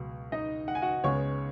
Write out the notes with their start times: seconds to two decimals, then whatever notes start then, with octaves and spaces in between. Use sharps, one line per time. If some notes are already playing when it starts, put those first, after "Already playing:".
Already playing: C#2 B2 F#3
0.32 D#4 D#5
0.68 F#5
0.75 G#5
0.82 F#4 F#5
1.04 C#2 C#3 G#3 B3 C#5 C#6